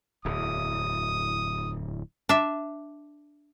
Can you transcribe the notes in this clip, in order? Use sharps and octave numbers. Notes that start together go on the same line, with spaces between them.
D1 E2 D#6
D4 E5